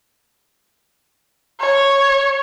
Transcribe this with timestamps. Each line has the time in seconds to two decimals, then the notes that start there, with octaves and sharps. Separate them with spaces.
1.61 C#5